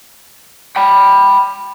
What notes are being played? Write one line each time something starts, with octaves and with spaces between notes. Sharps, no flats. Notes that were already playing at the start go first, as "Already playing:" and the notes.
G5 B5